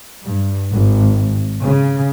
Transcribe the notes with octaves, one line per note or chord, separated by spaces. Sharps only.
G2
G#1
C#3